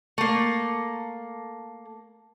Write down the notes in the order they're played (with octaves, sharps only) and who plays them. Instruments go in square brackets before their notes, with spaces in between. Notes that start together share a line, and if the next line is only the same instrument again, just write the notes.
[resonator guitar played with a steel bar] A3 A#3